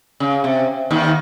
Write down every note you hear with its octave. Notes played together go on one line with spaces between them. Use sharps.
C#3
C3
D#2 D#3